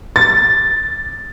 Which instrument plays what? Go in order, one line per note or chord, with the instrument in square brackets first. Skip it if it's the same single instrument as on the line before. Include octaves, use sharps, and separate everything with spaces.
[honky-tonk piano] A6